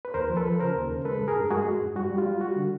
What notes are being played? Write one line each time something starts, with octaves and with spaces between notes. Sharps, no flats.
B4
D#2 A#4 C5
F3
A4 B4
F3
C#3 A#4 C5
D#2
C#3
G#3 A4 B4
G2
G#4 A#4
G2
G#3 F#4 G#4
G#3
G2
G3 F#4
G3
F4
G3
G3 F#4
D3